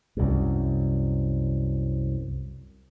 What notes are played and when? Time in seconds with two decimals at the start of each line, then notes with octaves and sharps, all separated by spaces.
0.17 C2 F#2